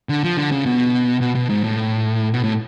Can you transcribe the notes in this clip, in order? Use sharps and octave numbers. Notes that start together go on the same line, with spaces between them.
D3
F3
D3
C#3
B2
B2
B2
G#2
A2
B2
A2